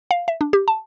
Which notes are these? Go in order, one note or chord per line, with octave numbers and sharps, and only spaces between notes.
F5
E5
D4
G4
A5